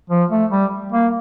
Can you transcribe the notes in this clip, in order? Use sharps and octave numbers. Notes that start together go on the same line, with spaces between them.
F3
A3
G3
A#3